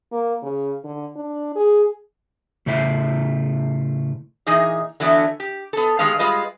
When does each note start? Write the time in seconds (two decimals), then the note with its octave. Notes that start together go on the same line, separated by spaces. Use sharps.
0.12 A#3
0.42 C#3
0.84 D3
1.16 D4
1.56 G#4
2.66 A2 C#3 A3 E4 C5 E5
4.46 A#2 E3 D#4 G#4 D#5
5.00 D3 E3 F#3 A3 B3
5.40 G4
5.73 B3 A4
5.99 D#3 G#3 B3 G4 F5
6.19 G3 G#3 F4 B4 D#5